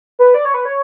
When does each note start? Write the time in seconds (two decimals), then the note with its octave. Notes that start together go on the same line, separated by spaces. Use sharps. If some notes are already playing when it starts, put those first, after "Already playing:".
0.19 B4
0.34 D5
0.45 C#5
0.54 B4
0.65 C#5